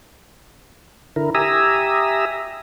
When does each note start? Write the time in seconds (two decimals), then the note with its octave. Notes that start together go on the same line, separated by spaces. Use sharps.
1.16 D3 E4 A#4
1.35 G4 E5 G#5 A#5 D#6 E6